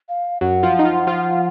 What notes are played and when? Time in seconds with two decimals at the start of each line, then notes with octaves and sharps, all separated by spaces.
0.09 F5
0.41 F#2 F#3 F#5
0.63 F3 F4
0.79 D#4
0.85 F3 F4
1.07 F3 F4